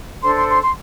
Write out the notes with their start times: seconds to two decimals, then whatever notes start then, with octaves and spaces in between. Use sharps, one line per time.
0.22 D4 A4 C5 C6
0.36 C6
0.49 C6
0.63 C6